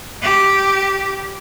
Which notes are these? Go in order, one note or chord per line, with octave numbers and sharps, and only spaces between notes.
G4